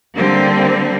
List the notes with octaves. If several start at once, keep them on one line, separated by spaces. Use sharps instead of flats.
D3 G3 A#3 C4